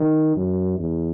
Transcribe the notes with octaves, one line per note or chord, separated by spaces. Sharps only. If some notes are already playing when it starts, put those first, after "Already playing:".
Already playing: D#3
F#2
E2